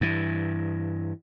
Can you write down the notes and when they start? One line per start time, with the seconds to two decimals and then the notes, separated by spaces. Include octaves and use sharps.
0.01 G2 E3